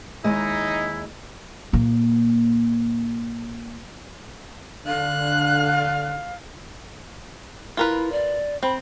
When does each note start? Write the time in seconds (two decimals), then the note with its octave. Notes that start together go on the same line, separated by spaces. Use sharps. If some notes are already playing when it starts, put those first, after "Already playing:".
0.24 D#2 G#3 D#4 E4 D#5
1.73 A#2 A#3
4.87 D3 F5 F#6
7.77 E4 F4 A#4 B4
8.12 D5
8.63 C4 B5